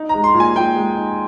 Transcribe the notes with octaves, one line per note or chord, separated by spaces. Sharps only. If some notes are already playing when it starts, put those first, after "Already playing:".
Already playing: D#4
A#5
G#3
C6
A#2
G#5
A#2 G5
G#3
D#4